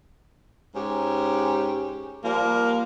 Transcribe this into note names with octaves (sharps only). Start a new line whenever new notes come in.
G#2 C#4 G4
F3 G3 A#3